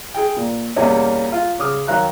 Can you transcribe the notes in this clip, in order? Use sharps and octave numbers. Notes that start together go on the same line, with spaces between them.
G#4 G5
A#2
E2 B2 G3 A#3 C#4
F4
C#3 D6 D#6 F6
D#3 F#3 F5 A#5 F#6